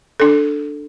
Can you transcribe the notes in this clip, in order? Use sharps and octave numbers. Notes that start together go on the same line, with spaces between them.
D4 A4